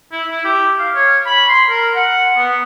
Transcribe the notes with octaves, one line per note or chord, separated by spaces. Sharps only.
E4
E4
G4
F5
C#5
B5
C6
A#4
F#5
B3